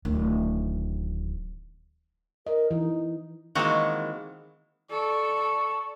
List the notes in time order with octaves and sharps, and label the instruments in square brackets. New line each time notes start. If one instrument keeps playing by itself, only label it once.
[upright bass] D1 D#3
[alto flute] A#4 [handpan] D#5
[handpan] E3 [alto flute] D#4
[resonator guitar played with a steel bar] D#3 E3 G#3 [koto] A#3 C4 F#4
[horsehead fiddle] A4 D5 [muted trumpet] C#6